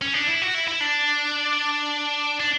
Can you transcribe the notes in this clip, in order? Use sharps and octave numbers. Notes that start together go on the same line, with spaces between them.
C#4
D4
E4
F#4
E4
E4
D4
D4